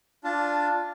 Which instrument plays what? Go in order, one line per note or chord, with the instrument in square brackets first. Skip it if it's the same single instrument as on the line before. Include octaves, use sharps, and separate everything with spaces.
[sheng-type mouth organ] D4 F4 A5